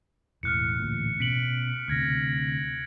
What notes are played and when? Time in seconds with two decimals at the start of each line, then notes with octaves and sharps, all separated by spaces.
0.43 E1 A1 A2 F6 F#6 C#7
0.79 A1 D2 A#2
1.20 B2 C#4 B6 D7 F#7
1.88 D2 C3 F6 G#6 A#6